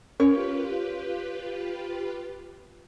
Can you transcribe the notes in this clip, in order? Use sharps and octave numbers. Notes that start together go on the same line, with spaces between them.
C#4 F4 G4 A#4 B4 C#5